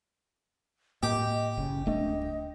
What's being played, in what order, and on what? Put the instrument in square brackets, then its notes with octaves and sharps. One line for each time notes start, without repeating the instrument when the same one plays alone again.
[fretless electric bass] A2 A#3 [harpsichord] G4 [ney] D#5
[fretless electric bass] F#1 C#3 [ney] C#4
[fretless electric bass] D1 A3 D4 [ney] D#5